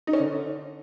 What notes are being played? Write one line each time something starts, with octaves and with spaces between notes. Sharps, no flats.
D#4
C#4
D3